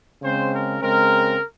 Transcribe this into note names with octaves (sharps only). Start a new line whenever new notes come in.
C#3 G#3 C4 C5
A#4
C#3 G#3 C4 A#4